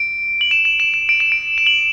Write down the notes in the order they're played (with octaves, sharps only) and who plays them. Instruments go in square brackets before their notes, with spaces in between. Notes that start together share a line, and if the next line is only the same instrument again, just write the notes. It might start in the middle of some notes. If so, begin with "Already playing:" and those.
Already playing: [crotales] D7
F#7
E7
E7
E7
E7
D7
E7
D7
E7
F#7